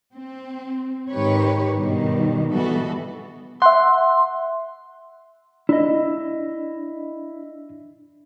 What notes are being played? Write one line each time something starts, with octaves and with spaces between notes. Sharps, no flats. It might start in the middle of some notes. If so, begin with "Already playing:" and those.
C4
G#2 D#3 G4 B4 C#5
G2 B2 D#3 G3
B2 E3 G3 B3 F#4 A4
E5 F#5 C6
D4 E4 D#5